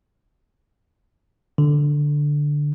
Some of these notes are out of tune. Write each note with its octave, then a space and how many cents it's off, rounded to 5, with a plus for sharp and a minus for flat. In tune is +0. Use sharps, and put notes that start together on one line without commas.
D3 +0